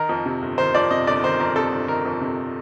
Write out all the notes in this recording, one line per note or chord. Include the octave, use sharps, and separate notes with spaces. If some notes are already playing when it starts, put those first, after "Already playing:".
Already playing: D#3 A#4
F2
C3
G1
D#3 C5
F2 D5
C3 D#5
G1 D5
D#3 C5
F2 A#4
C3 A4
G1
D#3 A#4
F2
C3